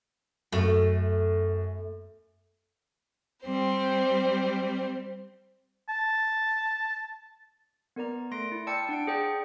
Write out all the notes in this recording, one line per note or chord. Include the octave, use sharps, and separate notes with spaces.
F#2 A3
G3 C4 C5
A5
B3 A#4 D5 A#5
A3 C6 A#6 D7
E4
D5 G5 A5 E6 F6 C#7
D4 F#5 A5 D7
G#4 C5 D5 G5